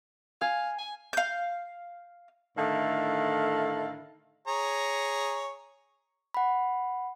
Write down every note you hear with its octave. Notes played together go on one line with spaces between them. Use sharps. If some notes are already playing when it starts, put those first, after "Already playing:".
F5 G#5
G#5
F5 G6
A2 D3 D#3 E4 A4 F5
G#4 C#5 A#5
F#5 B5